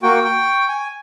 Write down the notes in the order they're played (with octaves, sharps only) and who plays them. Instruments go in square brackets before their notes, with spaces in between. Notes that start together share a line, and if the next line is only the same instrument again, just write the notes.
[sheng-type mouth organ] A#3 F#4 G5 [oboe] C#6
[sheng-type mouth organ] G5
G#5